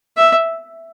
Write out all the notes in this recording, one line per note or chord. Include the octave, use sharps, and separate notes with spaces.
E5